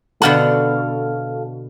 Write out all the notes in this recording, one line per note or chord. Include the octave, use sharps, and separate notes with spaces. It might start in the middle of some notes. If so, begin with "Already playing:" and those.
B2 D3 F#4 A4 F5